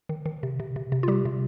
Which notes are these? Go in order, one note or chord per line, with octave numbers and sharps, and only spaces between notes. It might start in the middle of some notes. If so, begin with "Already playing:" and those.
D#3
D#3
C3
C3
C3
C3
F4
G3 G4
C3